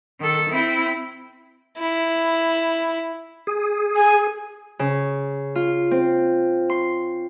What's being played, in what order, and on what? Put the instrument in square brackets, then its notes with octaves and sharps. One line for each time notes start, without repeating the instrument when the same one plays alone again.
[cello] D#3 A4
C4 E4
[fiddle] E4
[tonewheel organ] G#4
[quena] G#5
[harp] C#3
F4
C4
C6